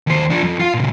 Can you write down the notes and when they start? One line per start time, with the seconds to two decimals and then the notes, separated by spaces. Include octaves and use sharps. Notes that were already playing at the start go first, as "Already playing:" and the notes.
0.07 D#2 C5
0.30 F3 D4
0.43 F2
0.59 F4 F5
0.74 A#2 C#3